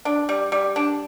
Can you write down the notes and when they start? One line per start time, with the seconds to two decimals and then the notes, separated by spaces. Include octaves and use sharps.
0.05 D4
0.29 G3
0.52 G3
0.76 D4